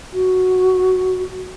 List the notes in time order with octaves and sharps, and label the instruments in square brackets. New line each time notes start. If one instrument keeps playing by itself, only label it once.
[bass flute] F#4